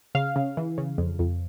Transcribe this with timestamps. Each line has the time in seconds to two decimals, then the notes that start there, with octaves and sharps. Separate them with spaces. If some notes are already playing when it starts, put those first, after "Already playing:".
0.15 C#3 F5
0.36 C#3
0.57 E3
0.78 C#3
0.98 F2
1.19 F2